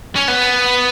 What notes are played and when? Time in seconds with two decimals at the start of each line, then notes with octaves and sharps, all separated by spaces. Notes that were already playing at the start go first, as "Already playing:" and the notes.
0.16 C#4
0.28 B3